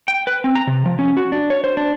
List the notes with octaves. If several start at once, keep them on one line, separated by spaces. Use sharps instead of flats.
G5
B4
C4
A#5
C3
F3
C#4
F#4
D4
C#5
C5
D4